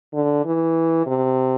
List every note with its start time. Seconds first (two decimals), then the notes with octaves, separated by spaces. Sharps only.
0.14 D3
0.45 E3
1.07 C3